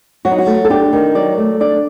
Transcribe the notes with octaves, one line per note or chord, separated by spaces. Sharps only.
F#3 F#4
D#4
F#4
A3
A4
D4 G4
D#3
F#3 D5
A3
D4 D5